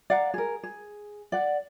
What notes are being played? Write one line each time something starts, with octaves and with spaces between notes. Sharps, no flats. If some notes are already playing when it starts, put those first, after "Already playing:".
D5 F5 F#5 A#5
G#4 A#4
G#4
D5 F#5